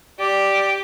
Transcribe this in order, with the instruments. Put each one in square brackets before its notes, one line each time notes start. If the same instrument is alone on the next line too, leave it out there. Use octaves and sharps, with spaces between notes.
[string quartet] G4 [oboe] D5